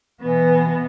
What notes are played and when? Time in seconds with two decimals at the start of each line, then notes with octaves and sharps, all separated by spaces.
0.21 B2 E3 B3